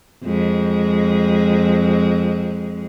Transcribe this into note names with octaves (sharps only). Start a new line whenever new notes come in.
F2 G#3